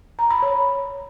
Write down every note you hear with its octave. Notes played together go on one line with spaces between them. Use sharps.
A#5
B5
C#5